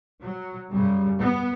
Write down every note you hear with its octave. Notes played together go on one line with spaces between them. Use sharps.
F#3
F#2 C#3 G3
B3